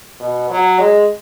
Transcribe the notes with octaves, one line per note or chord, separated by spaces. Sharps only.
B2
F#3
G#3